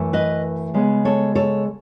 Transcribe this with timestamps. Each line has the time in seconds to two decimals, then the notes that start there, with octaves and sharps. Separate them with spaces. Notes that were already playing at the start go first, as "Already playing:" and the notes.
Already playing: F#2 E3 A3
0.13 B4 D#5
0.74 C#3 G#3 B3
1.05 A4 C#5
1.35 A4 C#5